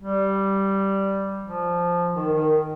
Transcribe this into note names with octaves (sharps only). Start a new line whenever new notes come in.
G3
F3
D#3
D#3